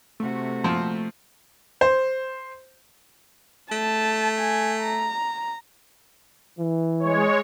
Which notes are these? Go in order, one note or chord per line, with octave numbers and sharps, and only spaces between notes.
C3 A3 F#4
A#2 F3 C4
C5
A3 A5
G#5
A#5
E3
G#3 C#5